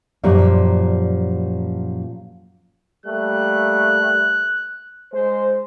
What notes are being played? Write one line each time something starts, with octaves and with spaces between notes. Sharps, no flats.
F#2 A#2 F3 G3
G3 A3 A#3 F#6
G#3 C5